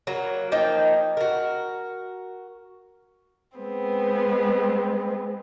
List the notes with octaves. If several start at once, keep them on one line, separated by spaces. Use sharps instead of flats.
F#3 A#3
F3 A#3 D#4 G5
F#4 A#4
G#3 B3 C4